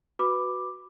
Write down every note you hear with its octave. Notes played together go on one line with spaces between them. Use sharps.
F#4 B4 B5 D6